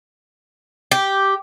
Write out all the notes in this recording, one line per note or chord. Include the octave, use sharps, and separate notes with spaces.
G4